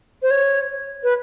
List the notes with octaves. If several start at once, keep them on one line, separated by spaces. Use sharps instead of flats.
C5
C#5
B4